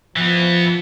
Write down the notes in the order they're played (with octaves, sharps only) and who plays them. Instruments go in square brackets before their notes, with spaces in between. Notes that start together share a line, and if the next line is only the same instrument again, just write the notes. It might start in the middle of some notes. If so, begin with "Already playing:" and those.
[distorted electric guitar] E3 B3 [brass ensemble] F3